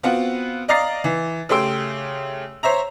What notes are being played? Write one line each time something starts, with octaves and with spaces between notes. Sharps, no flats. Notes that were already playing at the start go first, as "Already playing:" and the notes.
B3 C4 F4 F#4 F#5
D5 D#5 F5 A#5 A6 C7
E3
C#3 A3 G4 C6 E6 D7
C5 C#5 E5 A#5